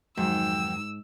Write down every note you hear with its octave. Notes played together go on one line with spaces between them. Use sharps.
F2 G#2 D#3 F#3 G5 E6